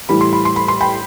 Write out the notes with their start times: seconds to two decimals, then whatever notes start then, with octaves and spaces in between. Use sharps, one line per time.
0.09 A2 E3 G3 B5
0.21 C6
0.33 B5
0.45 C6
0.56 B5
0.68 C6
0.81 G5 B5